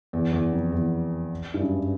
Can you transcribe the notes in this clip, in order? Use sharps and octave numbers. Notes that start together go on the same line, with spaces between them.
E2
E2
F2
E2
G2
F#2